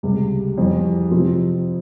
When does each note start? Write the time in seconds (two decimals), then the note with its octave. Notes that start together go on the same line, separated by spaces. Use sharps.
0.03 C#2 C3 G3
0.58 F2 E3 G3
1.11 C3 F3 C4 F4